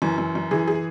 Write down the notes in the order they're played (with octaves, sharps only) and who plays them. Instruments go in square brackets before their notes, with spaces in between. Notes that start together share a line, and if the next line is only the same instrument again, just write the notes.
[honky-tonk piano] F#2 [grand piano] E3
[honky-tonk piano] F#2
F#2
[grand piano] E3 [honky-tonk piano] G#4
[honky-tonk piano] G#4